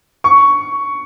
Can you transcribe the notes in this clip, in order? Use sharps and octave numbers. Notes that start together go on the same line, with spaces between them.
C#6